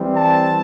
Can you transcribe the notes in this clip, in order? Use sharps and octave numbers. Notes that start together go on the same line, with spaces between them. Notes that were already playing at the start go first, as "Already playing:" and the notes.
Already playing: E3 G3 C4
A5